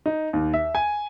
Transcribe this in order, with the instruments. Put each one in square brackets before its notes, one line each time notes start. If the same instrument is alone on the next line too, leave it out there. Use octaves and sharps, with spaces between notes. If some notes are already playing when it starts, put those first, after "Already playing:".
[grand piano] D#4
D#2
E5
G#5